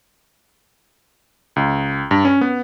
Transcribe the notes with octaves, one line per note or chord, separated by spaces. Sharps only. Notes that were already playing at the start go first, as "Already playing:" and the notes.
C#2
G2
C#4
B3